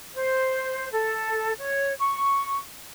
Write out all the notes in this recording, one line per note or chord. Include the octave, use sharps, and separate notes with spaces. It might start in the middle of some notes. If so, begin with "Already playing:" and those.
C5
A4
C#5
C#6